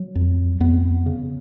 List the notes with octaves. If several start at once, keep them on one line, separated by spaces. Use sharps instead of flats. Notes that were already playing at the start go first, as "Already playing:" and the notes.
Already playing: F#3
F2
F2 B3
C#3